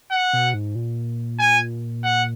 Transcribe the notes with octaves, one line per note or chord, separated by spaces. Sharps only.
F#5
B2
G#2
A#2
G#5
F#5